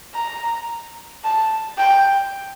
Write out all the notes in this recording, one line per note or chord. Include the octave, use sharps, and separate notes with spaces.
A#5
A5
G5